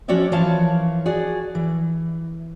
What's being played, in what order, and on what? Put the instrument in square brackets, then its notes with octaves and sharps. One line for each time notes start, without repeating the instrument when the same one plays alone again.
[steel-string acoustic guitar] F3 C#4 F#4 C#5 D5 E5
E3 F3 A#4 C#5 F5 A5
F#4 G#4 D5
E3